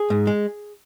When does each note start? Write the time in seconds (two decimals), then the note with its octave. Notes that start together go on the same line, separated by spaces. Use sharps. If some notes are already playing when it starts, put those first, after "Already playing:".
Already playing: G#4
0.10 G#2
0.27 G#3